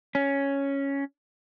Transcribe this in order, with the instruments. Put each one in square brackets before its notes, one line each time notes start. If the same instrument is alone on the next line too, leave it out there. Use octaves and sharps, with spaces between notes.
[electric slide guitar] C#4